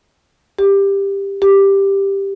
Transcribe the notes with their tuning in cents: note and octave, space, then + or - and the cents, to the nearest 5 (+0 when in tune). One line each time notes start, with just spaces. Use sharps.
G4 +15
G4 +5